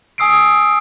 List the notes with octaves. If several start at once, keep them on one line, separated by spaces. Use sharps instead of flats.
G#5 D#6 E6 C7 D7